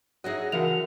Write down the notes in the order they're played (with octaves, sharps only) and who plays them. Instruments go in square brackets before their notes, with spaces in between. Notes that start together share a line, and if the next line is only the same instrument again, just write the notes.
[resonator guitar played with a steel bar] D#4 E4 F#4 [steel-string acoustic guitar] G#4 C#5 D#5
[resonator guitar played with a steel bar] A2 C#3 F#5 [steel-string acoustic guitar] E3 [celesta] F#4 A#4 F7